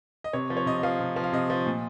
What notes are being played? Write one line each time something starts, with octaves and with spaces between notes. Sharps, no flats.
D#5
C3 C#5
F3
C#5
C3 D#5
D#5
F3 F5
C3
F3
F5
C3 D#5
F3
A#2